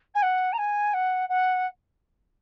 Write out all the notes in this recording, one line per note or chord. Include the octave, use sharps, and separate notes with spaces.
G#5
F#5
A#5
G#5
F#5
F#5